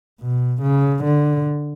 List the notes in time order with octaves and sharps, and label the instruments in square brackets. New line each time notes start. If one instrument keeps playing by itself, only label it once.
[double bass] B2
C#3
D3